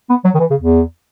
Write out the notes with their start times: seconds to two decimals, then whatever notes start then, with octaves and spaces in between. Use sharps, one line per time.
0.10 B3
0.25 F#3
0.35 D#3
0.40 E3
0.50 C#3
0.60 E2